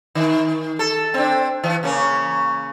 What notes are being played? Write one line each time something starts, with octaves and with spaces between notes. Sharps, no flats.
D#3
A4
C4 D4
E3
C#3 A#3 C#4